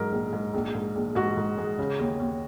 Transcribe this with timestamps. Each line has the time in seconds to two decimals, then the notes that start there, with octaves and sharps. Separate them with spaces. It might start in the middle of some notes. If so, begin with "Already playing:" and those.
Already playing: G#2 F#3 A#4
0.12 A#1
0.33 G#2
0.54 A#1
0.75 G#2
0.95 A#1
1.15 G#2 F#4
1.37 G#2
1.58 G#3
1.78 C#3
1.99 D#2
2.19 D#2